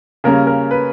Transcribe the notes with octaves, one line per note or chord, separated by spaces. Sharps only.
C#3 G3 A#3 C#4 A#4
A#4
B4